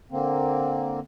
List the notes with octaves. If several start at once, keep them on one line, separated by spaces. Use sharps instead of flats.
D3 A#3 C4